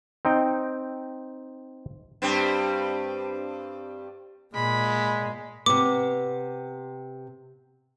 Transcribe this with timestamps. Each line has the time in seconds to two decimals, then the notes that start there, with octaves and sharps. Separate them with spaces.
0.25 C4 D#4 G5
2.22 G2 G3 C4
4.55 A#2 G#3 B5
5.66 C3 B3 D6